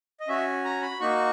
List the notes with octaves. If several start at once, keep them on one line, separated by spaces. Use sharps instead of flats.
D#5
C#4 F#4 E5
A#5
B5
A#3 D#4 F#4 C#6